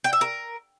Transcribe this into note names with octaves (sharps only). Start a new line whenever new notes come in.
G5
E5
A#4